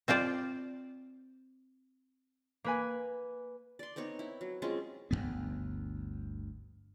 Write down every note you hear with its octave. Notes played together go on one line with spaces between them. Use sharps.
C4 F4 C5 D5
A#3 B4 G#5
D5 C6
B3 C4 D#4 C#5
E4
F#3
G#3 C4 C#4 F4
G1 D2 G2 B3